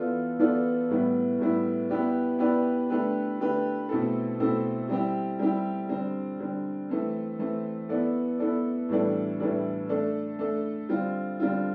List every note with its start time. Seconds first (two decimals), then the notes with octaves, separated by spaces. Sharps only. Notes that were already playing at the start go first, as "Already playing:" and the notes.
Already playing: E3 B3 F4 A4 D5
0.39 E3 B3 F4 A4 D5
0.89 A2 G3 B3 E4
1.39 A2 G3 B3 E4
1.89 B3 E4 G4 B4 D5
2.39 B3 E4 G4 B4 D5
2.90 D3 A3 D4 G4 B4
3.40 D3 A3 D4 G4 B4
3.89 B2 A3 C4 E4 A4
4.40 B2 A3 C4 E4 A4
4.89 G3 C4 E4 G4
5.39 G3 C4 E4 G4
5.89 D3 G3 C4
6.40 D3 G3 C4
6.89 E3 A3 C4
7.39 E3 A3 C4
7.89 B3 E4 A4 D5
8.39 B3 E4 A4 D5
8.89 A2 E3 G3 D4 A4
9.40 A2 E3 G3 D4 A4
9.89 A3 D4 A4
10.39 A3 D4 A4
10.89 D3 G3 C4 F4
11.40 D3 G3 C4 F4